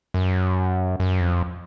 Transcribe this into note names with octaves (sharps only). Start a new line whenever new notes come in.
F#2
F#2
F2